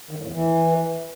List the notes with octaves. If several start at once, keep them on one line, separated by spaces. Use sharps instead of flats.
D#3
G2
A2
E2
E3